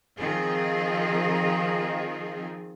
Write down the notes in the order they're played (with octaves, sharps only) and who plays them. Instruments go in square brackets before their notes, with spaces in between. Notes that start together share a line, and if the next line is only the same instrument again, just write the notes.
[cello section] D#3 F3 C4 F4 G#4